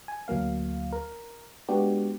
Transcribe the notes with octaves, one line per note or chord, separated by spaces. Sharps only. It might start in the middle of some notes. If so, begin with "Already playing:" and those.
G#5
D2 F#3 A#3 F5
A#4
G#3 B3 D4 F#4 G4